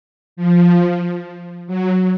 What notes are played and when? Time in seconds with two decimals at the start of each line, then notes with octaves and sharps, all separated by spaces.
0.36 F3
1.67 F#3